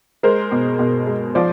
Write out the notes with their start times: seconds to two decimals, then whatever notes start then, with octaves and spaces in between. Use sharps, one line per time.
0.23 G#3 A#4 C5
0.51 B2
0.79 B2
1.07 G#3
1.35 F3 C5 D5